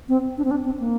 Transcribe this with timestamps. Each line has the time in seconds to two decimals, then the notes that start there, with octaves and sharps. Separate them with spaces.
0.09 C4
0.38 D4
0.44 C4
0.51 D4
0.65 C4
0.80 A#3